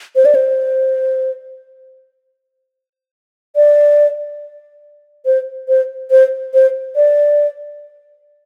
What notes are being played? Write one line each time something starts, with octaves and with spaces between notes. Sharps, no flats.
C5
D5
C5
D5
C5
C5
C5
C5
D5